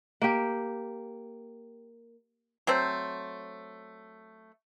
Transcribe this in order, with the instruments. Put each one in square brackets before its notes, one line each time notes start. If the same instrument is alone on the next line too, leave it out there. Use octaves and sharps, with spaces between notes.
[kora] A#3 G4
[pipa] F#3 A3 C4 C5